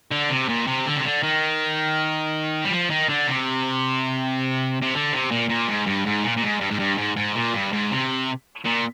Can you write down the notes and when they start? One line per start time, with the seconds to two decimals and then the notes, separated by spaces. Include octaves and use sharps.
0.12 D3
0.30 C3
0.49 A#2
0.67 C3
0.86 D3
0.96 C3
1.04 D3
1.23 D#3
2.65 G3
2.71 F3
2.90 D#3
3.09 D3
3.27 C3
4.82 C3
4.94 D3
5.12 C3
5.31 A#2
5.49 A#2
5.68 G#2
5.86 G2
6.05 G#2
6.24 A#2
6.37 A#2
6.43 G#2
6.60 G2
6.71 G#2
6.79 G2
6.98 G#2
7.16 G#2
7.35 A#2
7.54 G2
7.72 G#2
7.91 C3
8.65 A#2